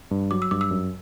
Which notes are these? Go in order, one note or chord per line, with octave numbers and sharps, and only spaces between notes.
G2
F#3 D6
E6
G2 D6
E6
F#2